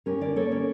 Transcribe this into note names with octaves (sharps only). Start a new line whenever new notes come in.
C#4 G4 A#4
D3 A#4 D5
A#3 A4 C#5
C#4